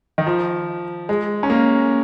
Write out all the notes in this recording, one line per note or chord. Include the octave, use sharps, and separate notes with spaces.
D#3
F3
G#3
C#4
A#3